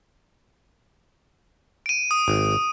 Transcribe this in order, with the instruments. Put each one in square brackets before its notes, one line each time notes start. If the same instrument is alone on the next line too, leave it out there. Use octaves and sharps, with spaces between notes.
[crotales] D7 D#7
D#6
[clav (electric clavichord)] G#1